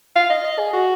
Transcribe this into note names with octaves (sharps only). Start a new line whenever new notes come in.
F5
D#5
D#5
G#4
F#4